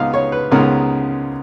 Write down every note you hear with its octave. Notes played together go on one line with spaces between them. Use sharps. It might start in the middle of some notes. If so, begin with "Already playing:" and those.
Already playing: C#2 C#3 G#3 B3 D#4 F5
C#5
B4
C#2 C#3 G#3 B3 D#4 A#4